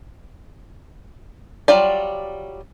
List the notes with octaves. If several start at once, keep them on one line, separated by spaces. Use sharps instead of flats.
F#3 G3 F4 D5